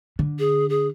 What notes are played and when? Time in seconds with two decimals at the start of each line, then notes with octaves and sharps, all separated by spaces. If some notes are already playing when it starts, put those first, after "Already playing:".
0.19 D3
0.39 G#4
0.69 G#4